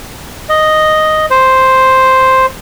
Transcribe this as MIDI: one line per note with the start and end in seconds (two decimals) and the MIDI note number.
0.49 1.26 75
1.31 2.46 72